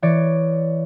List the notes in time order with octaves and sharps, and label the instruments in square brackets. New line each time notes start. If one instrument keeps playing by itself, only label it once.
[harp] E3 C#5 D5